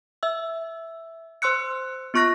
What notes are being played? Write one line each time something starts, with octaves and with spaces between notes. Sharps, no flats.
E5 E6
C5 C6 E6 F#6 C#7
B3 F4 C#6 F#6 A#6